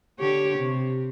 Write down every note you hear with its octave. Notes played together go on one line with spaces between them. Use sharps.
D3 G4 C#5
C3